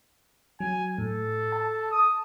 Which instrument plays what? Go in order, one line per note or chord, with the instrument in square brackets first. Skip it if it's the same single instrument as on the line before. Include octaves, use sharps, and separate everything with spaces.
[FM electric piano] F#3 [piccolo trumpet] G#5
[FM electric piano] A2 [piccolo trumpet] A4
[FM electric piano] A5
[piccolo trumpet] D#6